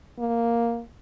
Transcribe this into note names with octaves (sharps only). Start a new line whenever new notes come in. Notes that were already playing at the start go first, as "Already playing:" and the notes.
A#3